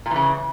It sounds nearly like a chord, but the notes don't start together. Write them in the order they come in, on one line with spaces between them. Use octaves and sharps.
A#2 E3 C#3